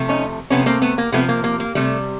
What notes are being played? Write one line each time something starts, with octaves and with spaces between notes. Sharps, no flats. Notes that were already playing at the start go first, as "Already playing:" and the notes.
Already playing: C3 F3 A3
C#4 D#4
C3 F3 A3 B3 C#4
A#3 C4
A3 B3
A#3
C3 F3 A3 B3
A#3
A#3
A#3
C3 D#3 G3 A3